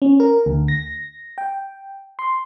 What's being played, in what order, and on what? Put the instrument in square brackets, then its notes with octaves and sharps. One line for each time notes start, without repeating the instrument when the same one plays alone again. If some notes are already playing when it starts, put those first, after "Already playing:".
[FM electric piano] C#4
A#4
D2
A#6
G5
C6